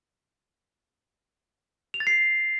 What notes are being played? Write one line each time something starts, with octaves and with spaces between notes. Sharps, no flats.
F7
A6
C7